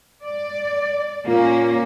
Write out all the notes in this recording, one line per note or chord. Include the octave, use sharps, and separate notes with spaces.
D5
A#2 A#3 C#4